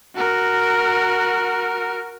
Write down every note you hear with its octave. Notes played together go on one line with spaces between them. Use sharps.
F#4 A#4